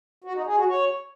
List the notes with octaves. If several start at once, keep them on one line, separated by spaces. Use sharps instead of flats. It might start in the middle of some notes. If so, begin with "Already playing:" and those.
F#4
D#4
G#4
F#4
C#5